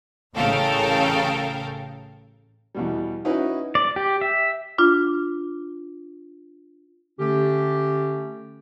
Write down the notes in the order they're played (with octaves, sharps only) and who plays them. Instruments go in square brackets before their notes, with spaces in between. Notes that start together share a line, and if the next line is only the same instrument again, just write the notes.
[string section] A1 C#3 A4 A#4 F5 G5
[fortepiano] E2 B2 G3
C#4 D#4 E4 F#4 B4
[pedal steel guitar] D5
G4
E5
[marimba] D4 F4
[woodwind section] D3 A3 C#4 G4